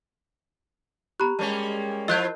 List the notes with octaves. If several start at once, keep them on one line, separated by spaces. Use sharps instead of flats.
B3 G4 A#5 B5 F#6
G3 G#3 A#3 C#4 A5
F3 E4 F4 A#4 D#5 F#6 G6